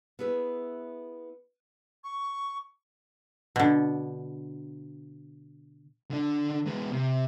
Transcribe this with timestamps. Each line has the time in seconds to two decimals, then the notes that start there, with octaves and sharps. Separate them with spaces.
0.19 B3 E4 G#4 B4
2.04 C#6
3.56 B2 D3
6.11 D3 D4
6.66 G#3 B3
6.92 C3